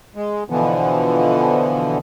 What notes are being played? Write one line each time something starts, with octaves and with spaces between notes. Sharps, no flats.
G#3
B2 D3 E3 F3 B3